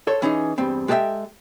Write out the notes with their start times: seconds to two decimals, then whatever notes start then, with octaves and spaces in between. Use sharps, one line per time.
0.07 A4 C5 C#5
0.22 E3 C#4 D#4 G#4
0.58 E2 G2 C4
0.88 G#3 G4 A4 D5 E5 G5